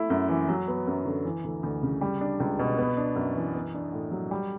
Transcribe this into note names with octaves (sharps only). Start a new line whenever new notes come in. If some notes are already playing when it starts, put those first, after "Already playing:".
Already playing: A3 E4
F#2
E3
F#3
B3
F#2
D3
E3
D2
D2
C#3
G3
D4
C#2
B2
B3
D4
F#2
E3
B3
D4
A2
F#3
G3